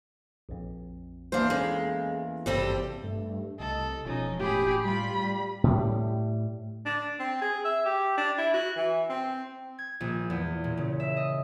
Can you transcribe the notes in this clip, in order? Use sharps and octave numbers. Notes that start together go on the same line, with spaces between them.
A#1 F2
E2 A#3 D4 C5 F5
G#3 C#4 E4 A4
G#1 G2 C3 G3 C4 A4
G2 A3
C2 A4 D#5
E1 F3 C#4 D#4
A2 G4 G#4 B5
G3 F4 B5
A2 G3
D4
C4
G#4
E5
G4
D4
E4
F#4
E3
C4
G#6
A#1
E2
A#2
C#3
E5
D#5